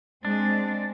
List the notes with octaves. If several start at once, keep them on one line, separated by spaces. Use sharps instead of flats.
G#3 C4 D4